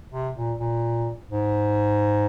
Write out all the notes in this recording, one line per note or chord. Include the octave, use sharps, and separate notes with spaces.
C3
A#2
A#2
G#2